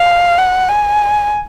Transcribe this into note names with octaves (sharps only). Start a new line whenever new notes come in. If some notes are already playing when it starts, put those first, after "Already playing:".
Already playing: F5
F#5
G#5